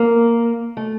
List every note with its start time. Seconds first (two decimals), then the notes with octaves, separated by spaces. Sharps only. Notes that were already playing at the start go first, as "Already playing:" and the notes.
Already playing: A#3
0.77 A3